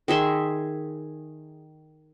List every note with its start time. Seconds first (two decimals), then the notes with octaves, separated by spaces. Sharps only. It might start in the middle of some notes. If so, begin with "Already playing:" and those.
0.08 D#3 G#4 E5 C6